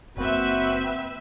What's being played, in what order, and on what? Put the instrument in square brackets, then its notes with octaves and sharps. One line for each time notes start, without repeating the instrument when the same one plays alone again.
[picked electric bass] F#1 A#3 [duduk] C4 [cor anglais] F#4 [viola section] B4 E5